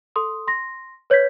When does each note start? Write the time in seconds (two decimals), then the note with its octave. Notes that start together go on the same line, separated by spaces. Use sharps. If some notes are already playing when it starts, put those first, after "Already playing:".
0.16 A4 C6 D#6
0.47 C6 A#6
1.10 B4 C#5 G6 G#6 B6